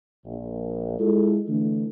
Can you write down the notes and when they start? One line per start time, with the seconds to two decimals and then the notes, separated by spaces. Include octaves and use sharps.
0.25 A#1
0.99 G#3 E4 F4 A4
1.47 D3 E3 A3